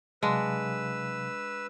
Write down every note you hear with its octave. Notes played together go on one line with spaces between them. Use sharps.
C3 F#3 G#3 D4 B4 F5 E6